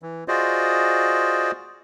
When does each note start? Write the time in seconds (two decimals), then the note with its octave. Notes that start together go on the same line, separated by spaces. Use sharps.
0.03 E3
0.28 F4 F#4 G#4 C5 D5 D#5